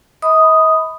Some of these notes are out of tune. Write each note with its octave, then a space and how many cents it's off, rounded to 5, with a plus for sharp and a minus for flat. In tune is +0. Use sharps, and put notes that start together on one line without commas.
D#5 +45 B5 +10 D#6 +0